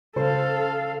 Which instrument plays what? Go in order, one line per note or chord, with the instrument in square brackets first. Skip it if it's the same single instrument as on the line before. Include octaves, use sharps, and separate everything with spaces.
[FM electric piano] C#3 [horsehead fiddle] A4 F5 [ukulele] C5